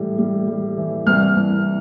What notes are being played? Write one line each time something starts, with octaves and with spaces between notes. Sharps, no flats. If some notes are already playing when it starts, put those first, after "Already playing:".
Already playing: A2 E3 G3
G3
G3
E3
C2 F6
C2